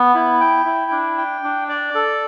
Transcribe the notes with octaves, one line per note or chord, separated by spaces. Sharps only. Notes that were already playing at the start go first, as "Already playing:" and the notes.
Already playing: B3
E4
G5
E4
D4
G5
D4
D5
A4